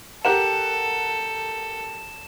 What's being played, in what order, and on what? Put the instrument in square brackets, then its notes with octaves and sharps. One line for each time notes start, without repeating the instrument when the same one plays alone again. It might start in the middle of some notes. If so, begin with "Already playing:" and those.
[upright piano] G4 A#4 F#5 [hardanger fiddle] A4 [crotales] E7